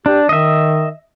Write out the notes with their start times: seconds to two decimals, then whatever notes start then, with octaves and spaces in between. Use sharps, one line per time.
0.06 D4 G4
0.29 D#3 D#5 E5